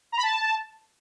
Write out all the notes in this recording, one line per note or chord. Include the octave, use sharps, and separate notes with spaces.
A#5
B5
A5